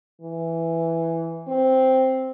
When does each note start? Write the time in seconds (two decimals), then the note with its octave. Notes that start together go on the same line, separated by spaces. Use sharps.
0.21 E3
1.48 C4